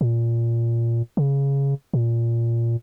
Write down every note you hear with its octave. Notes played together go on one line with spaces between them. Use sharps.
A#2
C#3
A#2